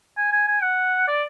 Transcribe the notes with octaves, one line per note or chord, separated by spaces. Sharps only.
G#5
G#5
G#5
F#5
D5